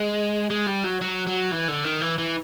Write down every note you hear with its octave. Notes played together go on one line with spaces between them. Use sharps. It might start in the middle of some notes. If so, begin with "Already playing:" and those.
Already playing: G#3
G#3
G3
F#3
F#3
F#3
E3
D3
D#3
E3
E3